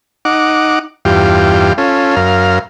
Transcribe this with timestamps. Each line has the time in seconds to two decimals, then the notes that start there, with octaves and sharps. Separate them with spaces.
0.25 D#4 F#5 D6
1.05 E2 G2 F4 G4
1.78 C#4 F4 A4
2.16 F#2 A#4 F5